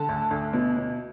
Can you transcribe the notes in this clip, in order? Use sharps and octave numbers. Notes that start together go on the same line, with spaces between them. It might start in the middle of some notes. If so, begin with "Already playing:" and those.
Already playing: D3 A5
D2
D2
B2
B2